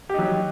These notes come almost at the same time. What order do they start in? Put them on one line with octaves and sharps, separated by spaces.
G4 D#4 F#3